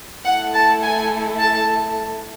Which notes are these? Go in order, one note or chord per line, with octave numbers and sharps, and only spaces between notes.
A3 E4 A4 F#5
A5
G#5
A5